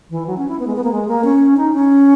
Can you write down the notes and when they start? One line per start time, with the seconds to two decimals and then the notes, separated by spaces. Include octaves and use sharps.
0.11 E3
0.27 F#3
0.37 C#4
0.49 E4
0.59 B3
0.67 G#3
0.76 B3
0.84 A#3
0.92 G#3
1.08 A#3
1.24 C#4
1.57 D#4
1.73 C#4